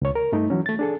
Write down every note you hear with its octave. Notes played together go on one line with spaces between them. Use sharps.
C#2 C#5
A#4
G2 A3 D#4
E3 F#3 C#4
A3 A6
D4 G#4 A4